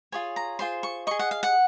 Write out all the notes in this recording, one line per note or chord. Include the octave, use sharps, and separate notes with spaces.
F4 G#4 C#5 G#5
A#5
F4 G#4 C5 C6
C#6
G#4 D#5 C#6
F#5
F5
F#5